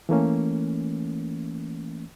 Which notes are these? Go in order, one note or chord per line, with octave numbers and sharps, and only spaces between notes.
E3 A3 A#3 C#4